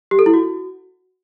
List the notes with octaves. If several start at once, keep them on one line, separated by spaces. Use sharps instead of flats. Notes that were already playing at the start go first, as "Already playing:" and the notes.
G4
A4
E4
F#4